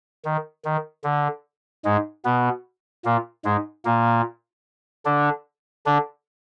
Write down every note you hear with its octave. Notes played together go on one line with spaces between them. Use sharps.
D#3
D#3
D3
G#2 G#3
B2 B3
A#2 A#3
G#2 G#3
A#2 A#3
D3 D4
D3 D4